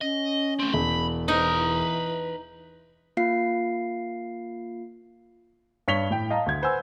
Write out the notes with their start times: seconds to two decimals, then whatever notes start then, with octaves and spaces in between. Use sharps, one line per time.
0.01 C#4 D#5
0.59 A3 C4
0.73 E1 B5
1.28 E3 D#4 B4 A#5
1.54 E3
3.17 A#3 F4 F5 C7
5.88 G2 C#5 B6 F7 G7
6.10 A2 G5
6.30 D#5 F5 A5 A#5
6.46 D2 G#6
6.62 B4 C5 F#5 G#5 E6